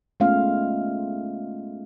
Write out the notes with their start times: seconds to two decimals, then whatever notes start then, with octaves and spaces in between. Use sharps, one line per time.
0.20 G#3 A3 B3 C#4 F4 F5